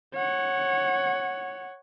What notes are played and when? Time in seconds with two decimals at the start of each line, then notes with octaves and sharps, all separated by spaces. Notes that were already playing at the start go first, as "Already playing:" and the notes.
0.14 C#5 F#5